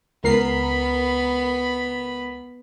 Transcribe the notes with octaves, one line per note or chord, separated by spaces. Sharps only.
C#2 B3 A#4 B5 C7